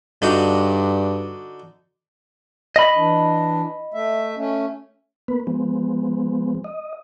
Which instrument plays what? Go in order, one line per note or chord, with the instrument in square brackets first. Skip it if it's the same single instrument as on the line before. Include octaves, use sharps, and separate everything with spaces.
[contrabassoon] G2 [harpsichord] D3 D#4 F#4
[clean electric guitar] D#5 B5
[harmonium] E3 D4
A3 E5
A3 C#4
[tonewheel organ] A#3 B3 B4
F3 G#3 B3 C4
D#5